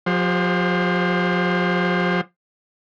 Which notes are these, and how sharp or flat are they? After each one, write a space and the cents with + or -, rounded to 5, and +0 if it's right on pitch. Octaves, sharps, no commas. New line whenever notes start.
F3 +40 G4 +35 C5 -5